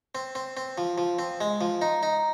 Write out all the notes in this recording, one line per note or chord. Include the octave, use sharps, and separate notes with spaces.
C4
C4
C4
F3
F3
C4
G#3
F3
D#4
D#4